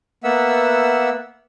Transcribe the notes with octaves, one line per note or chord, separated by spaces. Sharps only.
A#3 B3 E5 F#5 E6